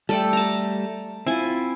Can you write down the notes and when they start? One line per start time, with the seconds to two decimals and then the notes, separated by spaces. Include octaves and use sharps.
0.09 G3 A3 A4 D5 G5
0.33 A5 A#5
1.27 C4 E4 F4 G#5